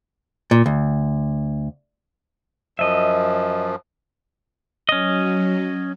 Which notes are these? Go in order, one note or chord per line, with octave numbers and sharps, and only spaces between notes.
A#2
D2
F#2 F3 D#5 E5
F#3 C#4 D#5